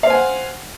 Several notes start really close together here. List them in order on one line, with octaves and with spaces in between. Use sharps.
F5 C5 G#5 F#5